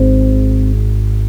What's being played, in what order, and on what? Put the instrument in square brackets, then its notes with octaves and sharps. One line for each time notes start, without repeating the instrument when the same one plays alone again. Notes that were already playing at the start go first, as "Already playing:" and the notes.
Already playing: [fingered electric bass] G#1 G#2 C4